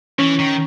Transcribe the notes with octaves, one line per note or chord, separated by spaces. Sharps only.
E3 C#4
D#3